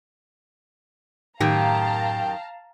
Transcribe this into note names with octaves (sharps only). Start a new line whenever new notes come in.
F#2 A2 D#3 G4 F5 G5 A5 A#5